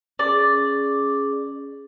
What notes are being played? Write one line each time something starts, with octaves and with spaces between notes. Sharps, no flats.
C#4 G#4 D5